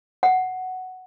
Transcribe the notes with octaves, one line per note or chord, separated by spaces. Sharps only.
F#5